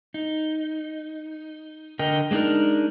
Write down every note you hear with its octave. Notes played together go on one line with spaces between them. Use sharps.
D#4
D3 A#4 D#5 G5
G#3 A#3 D4 D#4 A#4